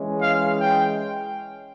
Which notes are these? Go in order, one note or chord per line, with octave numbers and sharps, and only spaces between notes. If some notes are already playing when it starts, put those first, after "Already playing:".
Already playing: E3 G#3 C#4
F5
G5